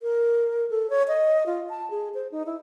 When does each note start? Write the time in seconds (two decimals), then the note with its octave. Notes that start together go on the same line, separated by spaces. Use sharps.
0.02 A#4
0.70 A4
0.90 C#5
1.08 D#5
1.46 F4
1.69 A5
1.90 G#4
2.15 C5
2.32 D#4
2.46 E4